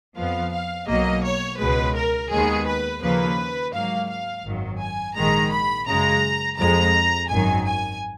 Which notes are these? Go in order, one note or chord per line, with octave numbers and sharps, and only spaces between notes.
F2 F3 B3 F5
F5
B1 B2 F#3 A#3 D#5
C#5
C#2 B2 G#3 B4
A#4
D#2 D#3 G#3 B3 G#4
B4
D#2 C#3 F3 A#3 B4
G#2 F#3 A#3 F5
F5
G#1 F#2 D#3 F#3
G#5
A#1 G#2 D#3 G#3 A#5
B5
F#2 C#3 G#3 A#5
F2 F3 G#3 A#5
G#1 F#2 D#3 F#3 G#5
G#5